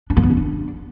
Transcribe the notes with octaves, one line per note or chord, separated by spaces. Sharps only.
D4
A#3
B3
E4
D4